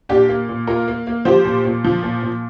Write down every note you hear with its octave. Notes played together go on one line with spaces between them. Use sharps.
A#2 D4 G4
A#3
A#2
A#3 F4 A#4
A#3
A#3
F3 G4 C5
A#2
A#2
F3
A#2
A#2